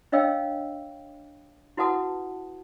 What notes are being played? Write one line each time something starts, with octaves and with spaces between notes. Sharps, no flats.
D4 C#5 D#5 F5 G5 E6
E4 F#4 B4 F#5 A5 D#6